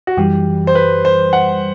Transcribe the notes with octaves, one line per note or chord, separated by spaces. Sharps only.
F#4
F#2 E3 G3 G4
C5
B4
C5
F#5